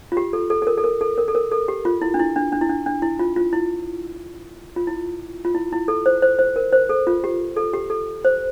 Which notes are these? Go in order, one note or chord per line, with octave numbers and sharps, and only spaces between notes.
F4
G4
A4
A4
A4
A#4
A4
A#4
A4
A#4
A4
A#4
A4
G4
F4
E4
D4
E4
D4
D4
E4
D4
D4
E4
F4
F4
E4
F4
E4
F4
E4
E4
A4
C5
C5
C5
A#4
C5
A4
F4
G4
A4
G4
A4
C5